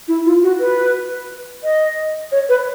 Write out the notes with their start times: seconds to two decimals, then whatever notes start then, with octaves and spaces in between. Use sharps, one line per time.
0.08 E4
0.26 F4
0.43 F#4
0.60 B4
1.64 D#5
2.32 C#5
2.49 B4